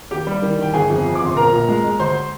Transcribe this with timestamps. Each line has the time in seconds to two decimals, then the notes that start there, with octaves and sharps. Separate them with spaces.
0.11 D#2 G4 G5
0.27 G3
0.42 D#3
0.58 D#3 G5
0.74 G1 G#4 G#5
0.90 F2
1.05 F2
1.15 D6
1.21 G1 C6
1.36 A#1 A#4 A#5
1.52 A#2
1.68 G#3
1.84 G#3
1.99 D2 C5 C6